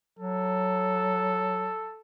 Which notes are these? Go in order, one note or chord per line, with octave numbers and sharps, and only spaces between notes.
F#3 A4